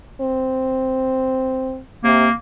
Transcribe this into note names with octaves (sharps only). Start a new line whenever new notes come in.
C4
C3 A#3